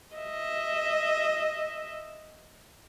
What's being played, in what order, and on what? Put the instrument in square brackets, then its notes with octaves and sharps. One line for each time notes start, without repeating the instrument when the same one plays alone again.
[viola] D#5 E5